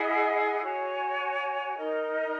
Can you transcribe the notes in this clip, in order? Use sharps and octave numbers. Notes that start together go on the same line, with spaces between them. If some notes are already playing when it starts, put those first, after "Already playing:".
Already playing: E4 G#4 D#5 F#5
F#4 C#5 G#5
D#4 A#4 D#5 A#5